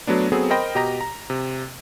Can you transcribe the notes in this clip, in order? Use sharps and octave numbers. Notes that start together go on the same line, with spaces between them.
F#3 A3 B3 D4
F#3 B3 C4 G#4 A4
A#4 C5 D#5 G5 B5 A#6
B2 G4 D#5 A#5 A#6
A#5
C3